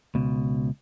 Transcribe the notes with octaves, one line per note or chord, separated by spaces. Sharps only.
C#2 B2